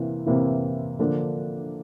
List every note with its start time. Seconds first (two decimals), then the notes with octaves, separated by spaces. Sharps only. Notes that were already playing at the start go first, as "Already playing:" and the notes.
Already playing: C3 E3 A#3
0.26 C3 E3 A#3 E4
0.99 D3 F3 A#3 D4